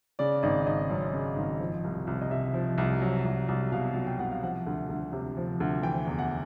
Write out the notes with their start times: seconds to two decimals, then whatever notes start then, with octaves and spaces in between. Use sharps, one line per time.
0.19 C#3 D5
0.43 G#1 D#5
0.66 G#1 D#5
0.90 F#2
1.13 C#3
1.36 G#1
1.60 F3
1.84 C2
2.07 C2
2.21 D#5
2.31 C3 E5
2.54 F3
2.78 C2
3.02 F#3
3.25 C2
3.48 C2
3.72 B2 F5
3.95 F#3
4.07 G5
4.19 C2 F#5
4.32 F5
4.43 F3 F#5
4.67 D2
4.90 D2
5.13 C3
5.37 F3
5.60 D2
5.83 E3 G5
6.06 E2
6.19 F#5